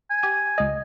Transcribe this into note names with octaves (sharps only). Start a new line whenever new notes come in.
G#5
G4 G#6 D#7
C#2 D#5